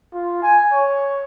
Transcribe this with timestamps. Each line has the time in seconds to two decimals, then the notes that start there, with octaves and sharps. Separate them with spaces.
0.13 F4
0.43 G#5
0.72 C#5